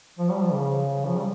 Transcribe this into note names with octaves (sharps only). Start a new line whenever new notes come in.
F3
G3
F3
C#3
F3
G3